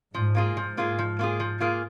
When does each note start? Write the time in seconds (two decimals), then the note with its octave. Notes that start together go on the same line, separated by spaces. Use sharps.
0.14 G#2 F3
0.35 A#3 F4 G#4
0.57 G#2 F3
0.77 A#3 F4 G#4
0.99 F3
1.19 A#3 F4 G#4
1.40 F3
1.60 A#3 F4 G#4